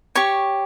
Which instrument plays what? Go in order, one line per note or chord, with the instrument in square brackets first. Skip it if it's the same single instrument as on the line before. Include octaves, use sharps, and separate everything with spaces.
[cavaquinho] G4 C#5 C#6